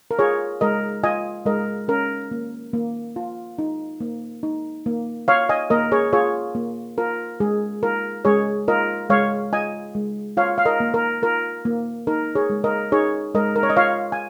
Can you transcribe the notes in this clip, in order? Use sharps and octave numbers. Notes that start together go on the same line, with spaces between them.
A#4
F4 G#4 C#5
G#3 A#4 D#5
F4 D#5 G#5
G#3 A#4 D#5
C#4 A#4
A#3
A#3
F4
D#4
A#3
D#4
A#3
F4 C#5 F5
D#5 G#5
A#3 A#4 D#5
G#4 C#5
F4 G#4 C#5
A#3
F4 A#4
G#3 G#4
F4 A#4
G#3 G#4 C#5
F4 A#4 D#5
G#3 C#5 F5
F4 D#5 G#5
G#3
F4 C#5 F5
F5
A#4 D#5
A#3
A#4
F4 A#4
A#3
D#4 A#4
G#4 C#5
G#3
A#4 D#5
D#4 G#4 C#5
G#3 A#4 D#5
A#4
C#5
D#5
F4 C#5 F5
G#5